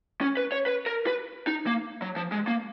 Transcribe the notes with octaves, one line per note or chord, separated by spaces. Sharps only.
C#4
B4
C#5
B4
A#4
B4
D#4
A#3
F#3
F3
G#3
A#3